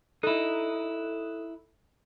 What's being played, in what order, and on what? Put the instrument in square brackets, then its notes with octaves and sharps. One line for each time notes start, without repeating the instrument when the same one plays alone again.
[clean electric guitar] D#4 E4 [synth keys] A4 D#6 F#6